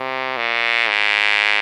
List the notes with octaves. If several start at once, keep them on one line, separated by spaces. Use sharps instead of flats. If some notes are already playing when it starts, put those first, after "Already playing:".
Already playing: C3
A#2
G#2